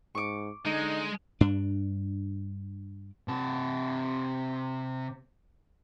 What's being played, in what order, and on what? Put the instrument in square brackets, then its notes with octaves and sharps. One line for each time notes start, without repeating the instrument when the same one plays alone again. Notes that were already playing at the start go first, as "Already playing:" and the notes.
[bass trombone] G#2 [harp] C#6 D6
[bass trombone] D3 [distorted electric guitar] G#3 [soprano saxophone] D#4
[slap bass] G2 D4
[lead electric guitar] C3 A5